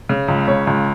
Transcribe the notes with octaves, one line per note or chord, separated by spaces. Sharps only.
C#3
C#2
C#3 C#5
C#2